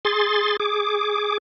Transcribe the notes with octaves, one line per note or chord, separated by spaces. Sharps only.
G#4 C6 A6
G#4 D6